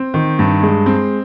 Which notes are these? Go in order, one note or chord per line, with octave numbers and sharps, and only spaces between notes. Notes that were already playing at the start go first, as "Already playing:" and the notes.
Already playing: C4
D#3
G2
G#3
C4